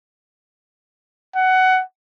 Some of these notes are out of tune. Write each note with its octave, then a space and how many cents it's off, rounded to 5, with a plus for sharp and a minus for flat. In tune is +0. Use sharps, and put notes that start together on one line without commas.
F#5 +15